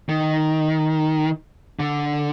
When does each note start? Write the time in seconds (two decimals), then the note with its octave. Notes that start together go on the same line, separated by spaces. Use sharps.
0.09 D#3
1.79 D3